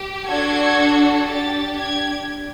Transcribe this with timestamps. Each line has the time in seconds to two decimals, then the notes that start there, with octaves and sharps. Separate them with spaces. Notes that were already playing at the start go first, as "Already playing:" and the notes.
Already playing: G4
0.25 D4 F#4 A4 G#6
1.25 D4 G4 A6
1.76 G#6